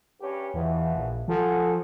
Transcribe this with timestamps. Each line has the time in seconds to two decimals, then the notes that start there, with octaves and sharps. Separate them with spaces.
0.21 G2 C#4 G4
0.54 E2 B2 E3 F3
0.95 A#1
1.28 F3 F#4 G#4 A4